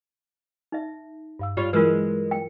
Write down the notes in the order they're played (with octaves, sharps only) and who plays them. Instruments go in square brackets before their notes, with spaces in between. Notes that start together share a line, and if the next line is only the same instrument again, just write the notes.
[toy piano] D#4 E5
[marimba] G2 F5 E6
[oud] G3 F4 C#5
[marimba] E3 F#3 E4 [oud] G#3 [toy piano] F4 A#4 B4
[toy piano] G5